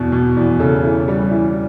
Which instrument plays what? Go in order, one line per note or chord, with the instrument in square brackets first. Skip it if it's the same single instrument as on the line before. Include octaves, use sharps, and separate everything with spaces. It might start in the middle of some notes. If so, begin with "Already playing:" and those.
Already playing: [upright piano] E2 B2
B2
E2
C#3 A4
E3
G3
E3